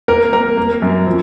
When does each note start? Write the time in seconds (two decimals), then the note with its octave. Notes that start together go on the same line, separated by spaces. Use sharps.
0.08 A#3 A#4
0.33 A#3 A#4
0.57 A#3
0.82 F#2
1.07 F3